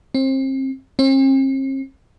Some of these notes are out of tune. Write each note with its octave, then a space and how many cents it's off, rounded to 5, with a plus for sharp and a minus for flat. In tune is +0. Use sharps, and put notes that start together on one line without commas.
C4 +30
C4 +45